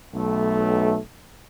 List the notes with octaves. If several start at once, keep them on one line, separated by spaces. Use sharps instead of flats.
B1 A3